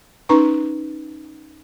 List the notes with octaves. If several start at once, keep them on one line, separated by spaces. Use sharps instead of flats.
C#4 D#4 B4 A#5 C#6